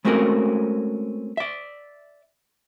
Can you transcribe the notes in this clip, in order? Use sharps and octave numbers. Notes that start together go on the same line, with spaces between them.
G#3 A3 C4 C#4 F#4 A#4
D5 E5